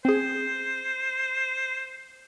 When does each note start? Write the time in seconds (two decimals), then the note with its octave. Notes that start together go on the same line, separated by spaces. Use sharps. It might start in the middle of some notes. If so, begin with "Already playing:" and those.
0.05 C4 G#4 C5